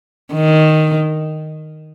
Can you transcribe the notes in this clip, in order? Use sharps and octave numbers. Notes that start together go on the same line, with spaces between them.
D#3